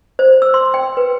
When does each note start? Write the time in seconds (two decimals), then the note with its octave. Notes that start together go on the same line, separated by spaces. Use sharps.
0.19 C5
0.42 E6
0.54 C6
0.74 G5
0.97 B4